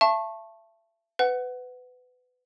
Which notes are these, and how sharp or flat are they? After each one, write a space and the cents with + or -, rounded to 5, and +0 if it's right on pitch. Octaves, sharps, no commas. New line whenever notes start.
E5 +35 A5 +0 C#6 -25
B4 +25 F#5 +0